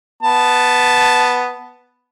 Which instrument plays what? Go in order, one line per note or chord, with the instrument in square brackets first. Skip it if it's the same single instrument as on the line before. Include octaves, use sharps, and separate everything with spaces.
[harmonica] B3 A5